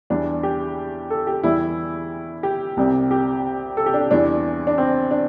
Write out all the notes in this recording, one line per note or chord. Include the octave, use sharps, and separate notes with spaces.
E2 E3 G3 D4
G4
A4
G4
E2 E3 G3 E4
G4
C2 C3 G3
G4
A4
G4
D4
E2 E3 G3 D4
D4
C4
D4